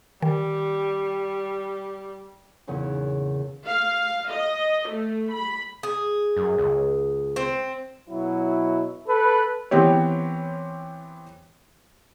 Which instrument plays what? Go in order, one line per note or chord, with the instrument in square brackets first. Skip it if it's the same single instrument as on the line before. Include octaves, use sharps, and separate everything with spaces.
[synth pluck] D#3 [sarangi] G3
[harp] E2 A#2 C#3 B3 C#4
[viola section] F5
D#5
A3
B5
[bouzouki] G#4
[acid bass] F#2
C#2
[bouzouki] C4
[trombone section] B2 F#3 E4
A4 B4
[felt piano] E3 B3 C4 G4 C#5